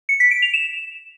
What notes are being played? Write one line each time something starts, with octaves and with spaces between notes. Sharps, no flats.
C#7
B6
D7
F7
E7